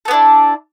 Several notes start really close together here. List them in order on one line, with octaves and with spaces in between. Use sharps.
A4 B3 D4 E4